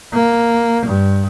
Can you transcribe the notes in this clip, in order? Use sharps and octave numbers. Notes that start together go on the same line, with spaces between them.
A#3
G2